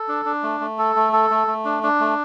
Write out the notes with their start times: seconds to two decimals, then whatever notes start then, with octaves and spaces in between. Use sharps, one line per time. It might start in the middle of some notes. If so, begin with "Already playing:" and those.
Already playing: A4
0.08 D4
0.25 D4
0.43 A3
0.60 A3
0.79 A4
0.96 A3
1.13 A4
1.30 A3
1.47 A3
1.65 D4
1.83 D4
2.00 A3